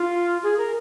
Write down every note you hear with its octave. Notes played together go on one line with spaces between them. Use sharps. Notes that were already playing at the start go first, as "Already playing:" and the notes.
Already playing: F4
G#4
A#4